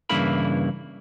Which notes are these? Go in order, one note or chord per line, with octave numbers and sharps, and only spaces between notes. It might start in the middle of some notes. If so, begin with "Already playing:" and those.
G2 C#3 E3 A#3 E4 B5